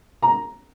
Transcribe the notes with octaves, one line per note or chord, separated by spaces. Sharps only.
A#5